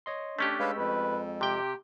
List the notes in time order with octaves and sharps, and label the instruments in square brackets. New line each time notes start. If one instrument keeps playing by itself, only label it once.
[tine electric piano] C#5 D#5 C6
[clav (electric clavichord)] A3 C#4 G4 [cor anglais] D4
[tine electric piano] G#3 E6 [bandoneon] B4 C#5 F5
[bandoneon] F2 [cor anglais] B4
[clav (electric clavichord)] C3 G5 [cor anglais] G4